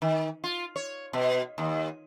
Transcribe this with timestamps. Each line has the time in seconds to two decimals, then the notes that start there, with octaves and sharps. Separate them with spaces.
0.02 D#3
0.44 F4
0.76 C#5
1.13 B2
1.58 D#2